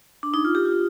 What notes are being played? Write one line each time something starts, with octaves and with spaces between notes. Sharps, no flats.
D4
D#4
F4
G4
F4